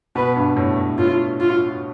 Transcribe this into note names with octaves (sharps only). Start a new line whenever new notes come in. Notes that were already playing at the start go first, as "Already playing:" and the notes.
B2 B4
G2
A2
A2
A2 F4
F4